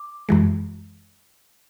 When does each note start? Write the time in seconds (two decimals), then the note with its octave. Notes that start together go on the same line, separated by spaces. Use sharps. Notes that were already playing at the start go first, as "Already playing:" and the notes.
Already playing: D6
0.29 F#2 E3 G#3